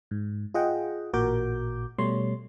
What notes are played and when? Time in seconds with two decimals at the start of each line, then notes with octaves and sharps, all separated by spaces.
0.11 G#2
0.54 F4 G#4 D#5 F#5 G5
1.13 A1 A#2 F#4 A#4 D6 G6
1.98 B2 G3 A3 C#5 C6